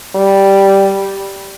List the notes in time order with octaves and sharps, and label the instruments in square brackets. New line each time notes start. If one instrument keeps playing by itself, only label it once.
[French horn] G3